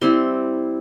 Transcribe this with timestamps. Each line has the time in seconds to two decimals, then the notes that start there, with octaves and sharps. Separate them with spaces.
0.01 G3 C4 E4 C6